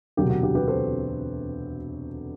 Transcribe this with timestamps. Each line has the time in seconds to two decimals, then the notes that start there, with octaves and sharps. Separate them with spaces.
0.17 E1 D2 C3 F#3 G4
0.30 F#4
0.43 G4
0.55 G4 B4
0.67 A4 C5